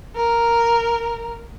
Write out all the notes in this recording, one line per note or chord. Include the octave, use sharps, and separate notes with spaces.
A#4